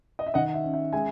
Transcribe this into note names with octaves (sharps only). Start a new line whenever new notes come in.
D#5
E5
D#3 D#5 F#5
E5
C#4
E5
G#3 E5 G#5